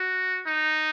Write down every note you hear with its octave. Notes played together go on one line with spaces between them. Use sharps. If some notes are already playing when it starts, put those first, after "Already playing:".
Already playing: F#4
D#4